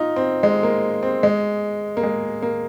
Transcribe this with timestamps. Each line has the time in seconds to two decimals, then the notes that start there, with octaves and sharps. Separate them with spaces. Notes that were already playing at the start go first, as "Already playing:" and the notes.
Already playing: D#4 F4
0.16 C4
0.43 G#3
0.63 A#3
1.03 C4
1.23 G#3
1.97 A#3
2.03 G#3
2.43 A#3